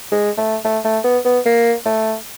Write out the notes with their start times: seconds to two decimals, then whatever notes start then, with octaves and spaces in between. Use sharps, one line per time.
0.12 G#3
0.38 A3
0.65 A3
0.85 A3
1.05 B3
1.25 B3
1.46 A#3
1.86 A3